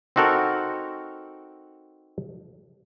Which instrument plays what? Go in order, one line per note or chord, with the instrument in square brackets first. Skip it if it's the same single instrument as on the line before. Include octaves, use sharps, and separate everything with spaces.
[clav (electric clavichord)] C4 D#4 F#4 A4 A#4